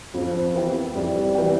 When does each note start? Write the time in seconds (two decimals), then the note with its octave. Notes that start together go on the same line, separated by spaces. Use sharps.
0.14 F2 F3
0.54 E3 B3 E4 G4
0.95 F2 G3
1.35 E3 B3 E4 G4